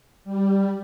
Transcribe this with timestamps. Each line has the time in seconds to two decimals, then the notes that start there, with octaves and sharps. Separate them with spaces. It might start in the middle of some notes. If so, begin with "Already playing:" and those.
0.25 G3